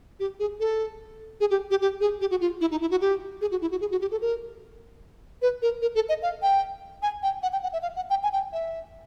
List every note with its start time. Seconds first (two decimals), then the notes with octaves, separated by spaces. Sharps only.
0.20 G4
0.39 G#4
0.60 A4
1.40 G#4
1.50 G4
1.70 G4
1.81 G4
2.01 G#4
2.21 G4
2.31 F#4
2.41 F4
2.61 E4
2.71 D#4
2.81 E4
2.91 F#4
3.01 G4
3.41 G#4
3.51 F#4
3.61 E4
3.71 F#4
3.81 G#4
3.91 F#4
4.01 G4
4.11 A4
4.21 A#4
5.42 B4
5.62 A#4
5.82 A#4
5.95 A4
6.09 D#5
6.22 F5
6.42 G5
7.02 G#5
7.23 G5
7.43 F#5
7.52 G5
7.63 F#5
7.73 E5
7.82 F5
7.96 F#5
8.10 G5
8.23 G#5
8.33 G5
8.53 E5